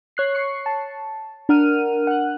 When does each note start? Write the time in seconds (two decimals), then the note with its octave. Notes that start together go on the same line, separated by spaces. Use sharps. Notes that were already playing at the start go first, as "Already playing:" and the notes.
0.17 C#5 F#6 C7
0.35 C#6 C7 C#7
0.66 A5
1.49 D4 A#4 F#5 F6 D#7
2.07 F#5 F#6